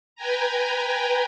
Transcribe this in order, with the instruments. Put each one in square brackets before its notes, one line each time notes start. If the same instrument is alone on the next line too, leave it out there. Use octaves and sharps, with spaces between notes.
[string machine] B4 G5 G#5 A#5